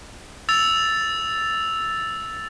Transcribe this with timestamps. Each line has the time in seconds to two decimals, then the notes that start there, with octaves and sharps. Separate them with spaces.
0.49 E6 A6 F7